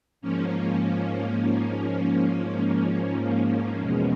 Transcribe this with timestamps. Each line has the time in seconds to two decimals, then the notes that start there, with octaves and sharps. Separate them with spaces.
0.21 G#2 F3 A#3 C#4
3.81 E2 B2 G#3 C#4